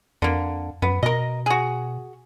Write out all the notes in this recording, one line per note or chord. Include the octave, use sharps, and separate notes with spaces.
F2 D3 A#3
F#2 B3
B2 A#4 D#5
F#4 G#4